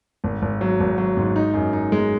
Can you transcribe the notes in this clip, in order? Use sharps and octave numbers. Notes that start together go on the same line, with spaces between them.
G#1
G#1
F#3
G#1
F#3
G#2
D#4
F#2
D#4
G#3